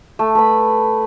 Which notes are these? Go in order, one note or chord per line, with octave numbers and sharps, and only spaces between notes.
A3
A3 B4 B5